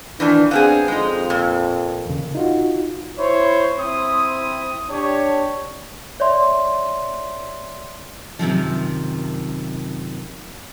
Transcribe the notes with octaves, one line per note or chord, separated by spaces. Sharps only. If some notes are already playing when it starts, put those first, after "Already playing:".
A#2 D#3 E3 D4
B3 C4 D4 G#4 F5
F2 G#3 D#4
A#2
E2 C#3
D#4 F4 F#4
E4 C5 C#5
C4 E4 C5 D#6
D4 G4 C#5
C#5 D5 E5 C6
F#2 C3 D#3 F3